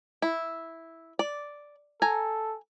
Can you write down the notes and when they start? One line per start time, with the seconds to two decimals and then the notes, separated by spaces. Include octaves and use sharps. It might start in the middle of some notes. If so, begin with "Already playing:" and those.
0.22 E4
1.19 D5
2.02 A4 G#5 A#5